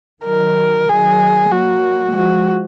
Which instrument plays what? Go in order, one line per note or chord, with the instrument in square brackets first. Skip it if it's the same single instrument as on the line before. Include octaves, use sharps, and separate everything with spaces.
[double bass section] D#3 F#3 [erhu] A#4
[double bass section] D#3 F#3 [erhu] G#4
[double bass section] F#3 A#3 [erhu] F#4
[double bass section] F3 G#3 [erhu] F#4